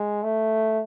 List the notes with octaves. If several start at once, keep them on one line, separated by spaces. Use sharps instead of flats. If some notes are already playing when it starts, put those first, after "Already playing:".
Already playing: G#3
A3